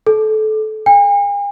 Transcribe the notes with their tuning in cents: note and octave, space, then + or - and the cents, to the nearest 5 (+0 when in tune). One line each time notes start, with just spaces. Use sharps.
A4 -25
G#5 -45